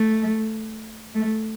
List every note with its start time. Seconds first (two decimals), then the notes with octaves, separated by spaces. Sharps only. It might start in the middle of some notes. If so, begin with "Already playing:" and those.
Already playing: A3
1.15 A3